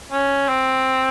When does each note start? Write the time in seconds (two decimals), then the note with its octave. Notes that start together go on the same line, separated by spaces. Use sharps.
0.12 C#4
0.48 C4